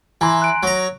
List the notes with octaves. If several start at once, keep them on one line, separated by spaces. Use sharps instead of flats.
E3 G#5 A#5 C6
F#6 D7
F#3 A#5